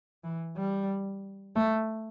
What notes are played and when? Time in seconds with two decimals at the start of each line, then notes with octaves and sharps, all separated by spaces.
0.24 E3
0.57 G3
1.56 A3